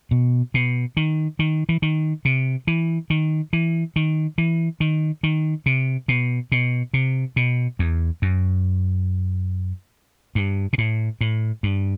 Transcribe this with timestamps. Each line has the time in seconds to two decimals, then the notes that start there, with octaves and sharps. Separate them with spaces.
0.11 B2
0.54 B2
0.97 D#3
1.39 D#3
1.69 E3
1.82 D#3
2.25 C3
2.67 E3
3.10 D#3
3.53 E3
3.96 D#3
4.38 E3
4.80 D#3
5.23 D#3
5.66 C3
6.08 B2
6.52 B2
6.94 C3
7.36 B2
7.79 E2
8.22 F#2
10.35 G2
10.73 B2
10.78 A2
11.21 A2
11.63 G2